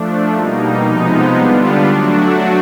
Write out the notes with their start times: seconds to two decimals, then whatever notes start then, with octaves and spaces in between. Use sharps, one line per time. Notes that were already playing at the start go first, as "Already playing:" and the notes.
Already playing: F3 A3 D4
0.33 B2 G3 A#3 D#4
0.85 C3 F3 G#3 B3 D#4
1.35 D3 G3 B3 D4 F4
1.87 F#3 A3 D4 F#4